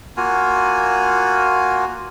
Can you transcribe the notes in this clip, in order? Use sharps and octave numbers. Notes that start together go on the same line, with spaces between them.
A#3 F4 F#4 G#5